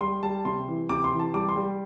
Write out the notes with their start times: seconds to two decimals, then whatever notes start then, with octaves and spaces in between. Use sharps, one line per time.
0.01 G3 C6
0.23 G3 A5
0.45 C3 C6
0.67 E3
0.89 C3 D6
1.04 C6
1.12 E3
1.19 A5
1.34 G3 D6
1.49 C6
1.56 G3